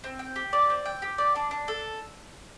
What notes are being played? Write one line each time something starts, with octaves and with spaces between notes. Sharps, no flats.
C4
G5
G4
D5
C4
G5
G4
D5
D4
D4
A4